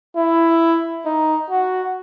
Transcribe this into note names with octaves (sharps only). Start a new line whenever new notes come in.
E4
D#4
F#4